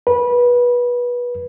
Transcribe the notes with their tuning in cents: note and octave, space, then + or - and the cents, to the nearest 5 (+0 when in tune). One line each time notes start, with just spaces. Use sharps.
B4 -25